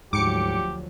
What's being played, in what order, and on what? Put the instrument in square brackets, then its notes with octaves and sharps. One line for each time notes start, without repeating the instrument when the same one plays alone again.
[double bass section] D2 F3 F#3 [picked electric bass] G#2 [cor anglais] G4 [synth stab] D6 C#7